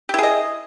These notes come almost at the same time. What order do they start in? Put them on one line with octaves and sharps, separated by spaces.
G4 E4 G#4 D#5